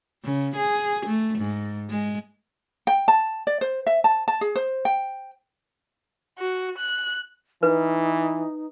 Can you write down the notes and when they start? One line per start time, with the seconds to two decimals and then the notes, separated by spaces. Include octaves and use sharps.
0.24 C#3
0.56 G#4
1.07 A3
1.39 G#2
1.89 G#3
2.87 G5
3.08 A5
3.47 D5
3.61 C5
3.87 E5
4.04 A5
4.28 A5
4.41 G#4
4.56 C5
4.85 G5
6.39 F#4
6.78 F#6
7.63 E3 D#4 B4